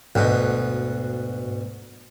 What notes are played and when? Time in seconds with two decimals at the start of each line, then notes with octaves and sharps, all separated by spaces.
0.15 D2 G#2 B2